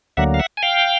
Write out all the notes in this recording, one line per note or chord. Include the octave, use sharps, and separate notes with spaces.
D2 D3 F#3 A#3 E5 F#5
F5
E5 F#5
G#5
F5 G5